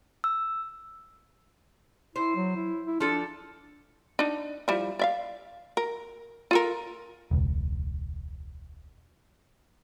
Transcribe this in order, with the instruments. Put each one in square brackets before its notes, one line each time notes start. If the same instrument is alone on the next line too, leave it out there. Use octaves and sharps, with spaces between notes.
[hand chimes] E6
[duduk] E4 [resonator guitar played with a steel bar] C5
[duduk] F#3
E4
E4
[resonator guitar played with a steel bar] F3 A4 [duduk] D4
[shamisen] D4 D#4
F3 G3 E4
D5 E5 F5
A#4
F4 A4 A#4
[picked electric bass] E1 C#2